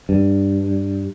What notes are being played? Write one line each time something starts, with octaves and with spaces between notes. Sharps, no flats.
G2